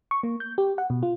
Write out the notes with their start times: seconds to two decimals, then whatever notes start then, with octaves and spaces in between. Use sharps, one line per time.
0.11 C#6
0.23 A#3
0.40 G6
0.58 G4
0.78 F#5
0.90 B2
1.03 F4